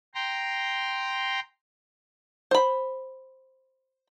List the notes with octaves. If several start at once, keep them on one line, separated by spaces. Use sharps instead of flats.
G5 A#5 C6
C5 B5